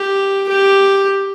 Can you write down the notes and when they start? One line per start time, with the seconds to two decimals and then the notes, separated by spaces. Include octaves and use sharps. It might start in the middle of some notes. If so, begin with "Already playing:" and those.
Already playing: G4
0.48 G4